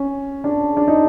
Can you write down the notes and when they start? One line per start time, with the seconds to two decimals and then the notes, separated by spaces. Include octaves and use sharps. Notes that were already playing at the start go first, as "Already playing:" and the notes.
Already playing: C#4
0.44 D4
0.77 D4
0.88 D#4